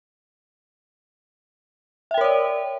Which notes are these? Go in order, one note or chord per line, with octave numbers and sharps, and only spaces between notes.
A#4 C#5 D5 E5 G5